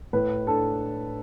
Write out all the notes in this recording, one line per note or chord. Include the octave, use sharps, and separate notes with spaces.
A2 B4
D4 A4